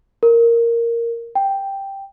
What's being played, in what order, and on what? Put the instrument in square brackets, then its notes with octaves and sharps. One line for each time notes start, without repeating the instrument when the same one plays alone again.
[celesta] A#4
G5